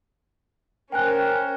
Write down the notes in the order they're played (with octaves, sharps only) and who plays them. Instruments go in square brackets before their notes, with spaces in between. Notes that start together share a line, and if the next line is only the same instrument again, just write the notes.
[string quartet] C#4 C5 [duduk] A#4 [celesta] G5 G#5 F#6